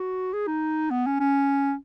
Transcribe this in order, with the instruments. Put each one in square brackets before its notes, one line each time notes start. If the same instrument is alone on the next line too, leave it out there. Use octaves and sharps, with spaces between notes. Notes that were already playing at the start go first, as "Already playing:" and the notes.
Already playing: [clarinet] F#4
G#4
D#4
B3
C#4
C#4